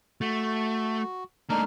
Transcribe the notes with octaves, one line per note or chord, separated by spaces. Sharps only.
A3 F#4
A3 A#3 D4 D#4 F6